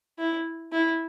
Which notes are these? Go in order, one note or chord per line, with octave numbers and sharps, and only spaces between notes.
E4
E4